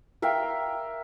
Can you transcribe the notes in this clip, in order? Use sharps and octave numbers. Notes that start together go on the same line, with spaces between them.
A#4 E5 F5 G5